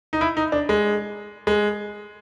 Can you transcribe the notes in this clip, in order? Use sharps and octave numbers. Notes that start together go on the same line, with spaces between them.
D#4
E4
D#4
D4
G#3
G#3